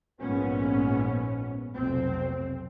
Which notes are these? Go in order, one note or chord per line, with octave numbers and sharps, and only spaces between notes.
A#1 G#2 B3 C#4
F1 B1 C4